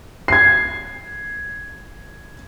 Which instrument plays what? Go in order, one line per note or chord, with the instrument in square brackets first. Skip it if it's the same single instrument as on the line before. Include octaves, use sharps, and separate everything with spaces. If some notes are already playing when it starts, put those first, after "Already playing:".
[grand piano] G#6 C7